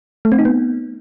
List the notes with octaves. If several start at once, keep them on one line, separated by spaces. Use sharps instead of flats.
A3
C4
D#4
B3